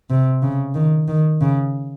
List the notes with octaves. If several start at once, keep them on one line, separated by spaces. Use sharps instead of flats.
C3
C#3
D#3
D#3
C#3